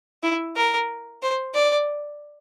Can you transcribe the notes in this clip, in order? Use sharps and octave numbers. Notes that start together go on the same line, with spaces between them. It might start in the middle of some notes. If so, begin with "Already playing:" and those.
E4
A#4
C5
D5